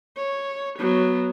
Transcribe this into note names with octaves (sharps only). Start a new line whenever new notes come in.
C#5
F#3 B3